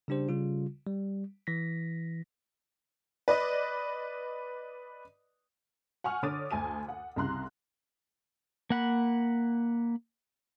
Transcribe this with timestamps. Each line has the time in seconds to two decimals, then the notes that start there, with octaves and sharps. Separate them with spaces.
0.08 C#3 G3 D4 G4 C5
0.29 C#3 G3 F4
0.87 G3
1.47 E3 A#6 B6
3.28 B4 D5 D#5
6.04 F#5 G#5 C#6 F6
6.23 D3 C#5 D6 D#6 A6 D#7
6.51 D2 G#5 A5 D#7
6.89 F#5
7.16 C2 C#3 A#5 C6 F#6
8.70 A#3 F#5 B5